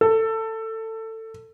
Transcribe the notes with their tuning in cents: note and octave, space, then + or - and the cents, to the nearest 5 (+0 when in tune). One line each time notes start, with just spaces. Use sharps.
A4 +20